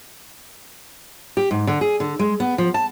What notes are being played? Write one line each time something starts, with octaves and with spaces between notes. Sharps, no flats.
G4
G#2
D3
G#4
D3
G#3
B3
F3
A5